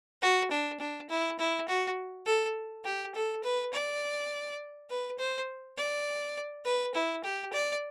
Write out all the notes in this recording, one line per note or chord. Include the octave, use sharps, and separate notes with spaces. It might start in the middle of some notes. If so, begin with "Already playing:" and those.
F#4
D4
D4
E4
E4
F#4
A4
G4
A4
B4
D5
B4
C5
D5
B4
E4
G4
D5